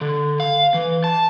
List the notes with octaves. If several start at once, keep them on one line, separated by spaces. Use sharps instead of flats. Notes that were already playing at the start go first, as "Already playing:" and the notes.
D3
F5
E3
A5